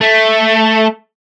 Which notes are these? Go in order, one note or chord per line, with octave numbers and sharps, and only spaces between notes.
A3